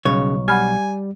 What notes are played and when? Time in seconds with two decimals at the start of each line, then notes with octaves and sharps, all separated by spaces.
0.05 B1 C#3 G3 C#5
0.48 G3 F#5 G#5 B5 F6